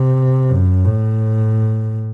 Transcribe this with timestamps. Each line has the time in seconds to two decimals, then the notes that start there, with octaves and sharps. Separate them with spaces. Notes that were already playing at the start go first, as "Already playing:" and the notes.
Already playing: C3
0.49 F#2
0.85 A2